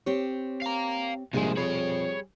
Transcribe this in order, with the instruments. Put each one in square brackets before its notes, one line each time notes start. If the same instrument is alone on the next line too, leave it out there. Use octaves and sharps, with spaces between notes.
[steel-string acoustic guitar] C4 G4 C#5
[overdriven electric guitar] F5 A#5
[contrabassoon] A#1 [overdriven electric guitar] C3 G#3 [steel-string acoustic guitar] G3 G#4 C5
[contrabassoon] F2 [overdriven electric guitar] C#5 B5